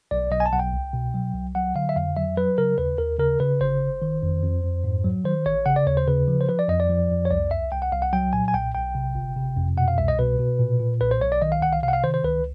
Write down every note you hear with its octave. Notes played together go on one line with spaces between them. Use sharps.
B1 D5
B1 D#5
G#5
A5
B1 F#5
G5
C2
B2
F#3
C2
F#3 F#5
D3 F5
E5
F2 F5
F#3 E5
F#3 B4
C#3 A#4
D#2 B4
D#2 A#4
C#3 A#4
C#3 B4
G1 C5
G1
D#3
F2
F2
F2
G#2
F#3
D#3 C5
A1 C#5
C#3 F#5
D5
D#2 C#5
C5
C#3 B4
F3
C5
F3 B4
D5
F2 D#5
D5
F3
F2
C#5
C2 D5
C2 E5
C2 G5
F#5
C2 F5
F#5
F#3 G5
A#2 G#5
G#5
B1 G5
B1 G5
C3
G1
C3
F2
B2 F#5
F5
C2 E5
D#5
B2 B4
B2
A#2
A#2
B1 B4
C5
B1 C#5
D5
D#3 D#5
F5
C2 F#5
F5
C3 F5
F#5
F5
D#3 C5
C5
C#2 B4